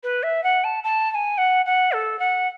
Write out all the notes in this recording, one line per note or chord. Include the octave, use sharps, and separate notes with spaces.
B4
E5
F#5
A5
A5
A5
G#5
F#5
F#5
A4
F#5